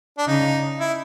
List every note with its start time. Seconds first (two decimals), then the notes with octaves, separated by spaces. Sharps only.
0.18 D4
0.27 C#3 D#4
0.80 E4